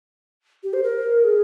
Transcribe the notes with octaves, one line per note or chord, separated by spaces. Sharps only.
G4
C5
A#4
G#4